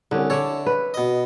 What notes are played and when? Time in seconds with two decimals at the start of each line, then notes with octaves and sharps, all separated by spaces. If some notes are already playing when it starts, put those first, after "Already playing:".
0.11 C2 D3 C#4
0.30 D3 A4 C#5 D5 E5
0.66 B4
0.94 B2 D#5